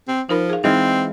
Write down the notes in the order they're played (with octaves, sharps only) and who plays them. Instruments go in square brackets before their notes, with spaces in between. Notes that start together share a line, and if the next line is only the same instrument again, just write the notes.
[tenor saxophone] C4
[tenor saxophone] F3 [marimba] D#4 A#4 B5
[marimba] G#4 F5
[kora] E3 G#3 F5 [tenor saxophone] C4 [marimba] D#4